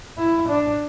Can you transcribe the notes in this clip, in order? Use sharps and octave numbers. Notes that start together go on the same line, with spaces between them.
E4
D4